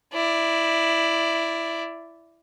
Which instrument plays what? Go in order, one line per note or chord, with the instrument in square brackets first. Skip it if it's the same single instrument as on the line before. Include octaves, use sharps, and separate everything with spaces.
[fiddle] E4 D5